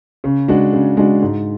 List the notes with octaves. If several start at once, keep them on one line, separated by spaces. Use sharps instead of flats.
C#3
G#3 D4 F#4
C#3
G#3 D4 F#4
G#2